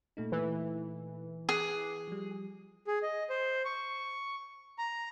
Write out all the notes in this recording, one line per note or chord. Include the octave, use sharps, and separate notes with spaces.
A#2 A3 D#4
E3
G#4 D6 F#6
F3 G3
G#4
D#5
C5
C#6
A#5